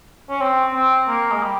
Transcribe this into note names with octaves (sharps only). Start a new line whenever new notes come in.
C#4
C4
C4
A#3
G#3
G3